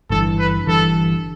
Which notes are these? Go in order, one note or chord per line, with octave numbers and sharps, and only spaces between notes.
G1 G2 E3 A4
B4
G1 G2 E3 A4